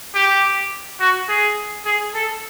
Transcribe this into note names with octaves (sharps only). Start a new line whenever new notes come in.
G4
F#4
G#4
G#4
A4